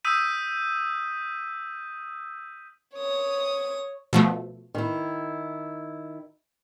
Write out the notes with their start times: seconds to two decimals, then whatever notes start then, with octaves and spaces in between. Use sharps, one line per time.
0.05 D#6 E6 G6 B6 D#7
2.95 C#5 D#6
4.13 B2 F3 A3
4.75 D#3 E4